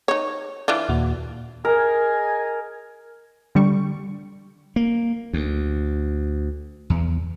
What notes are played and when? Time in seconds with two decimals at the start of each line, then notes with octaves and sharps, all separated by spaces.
0.08 D#4 C#5
0.68 E3 D4 F4
0.89 D#2 A#2 F#4
1.65 G#4 A#4 D#5 G#5
3.55 D3 G3 C#6
4.76 A#3
5.33 D2
6.90 E2